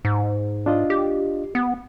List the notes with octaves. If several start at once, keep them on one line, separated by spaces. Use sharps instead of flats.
G#2
D4 F4 D#5
G4
B3